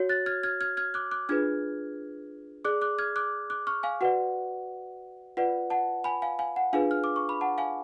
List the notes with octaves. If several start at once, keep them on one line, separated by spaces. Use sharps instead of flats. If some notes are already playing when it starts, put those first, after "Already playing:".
Already playing: F#4 C#5
F#6 A6
F6 G#6
F6 G#6
F6 G#6
F6 G#6
D6 F#6
D6 F#6
D4 F4 G#4 B4 F6 G#6
G#4 D5 D6 F#6
D6 F#6
F6 G#6
D6 F#6
D6 F#6
C#6 F6
F5 G#5
F#4 B4 D5 F#5
F4 B4 D5 F#5
F#5 A5
G#5 B5
F5 G#5
F5 G#5
F#5
D4 F4 G#4 B4 F5 G#5
F6
D6
C#6
B5
F#5 A5
F5 G#5